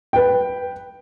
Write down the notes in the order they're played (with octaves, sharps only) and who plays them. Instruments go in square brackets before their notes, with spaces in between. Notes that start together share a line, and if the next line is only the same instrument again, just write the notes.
[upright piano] B4 G5